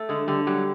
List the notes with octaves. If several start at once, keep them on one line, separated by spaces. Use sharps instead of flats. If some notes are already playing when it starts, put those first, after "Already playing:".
Already playing: A3
D3 G#3 G#4
D3 G3 G4
F#3 G3 G4